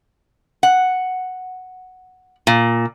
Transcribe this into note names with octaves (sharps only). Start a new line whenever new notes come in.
F#5
A#2